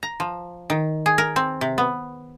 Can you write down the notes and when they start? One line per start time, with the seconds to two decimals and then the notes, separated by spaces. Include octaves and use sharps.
0.03 A#5
0.20 F3
0.70 D#3
1.06 G#4
1.18 A#4
1.36 C4
1.61 C3
1.78 B3